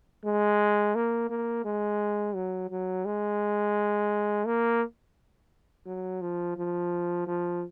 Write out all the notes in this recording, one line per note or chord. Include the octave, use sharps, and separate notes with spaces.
G#3
A#3
A#3
G#3
F#3
F#3
G#3
A#3
F#3
F3
F3
F3